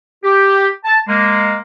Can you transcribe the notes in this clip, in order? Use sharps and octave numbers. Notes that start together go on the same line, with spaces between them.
G4
A5
G#3 A#3